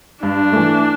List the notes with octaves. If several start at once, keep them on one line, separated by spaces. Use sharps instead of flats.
G2 D4
E3 A3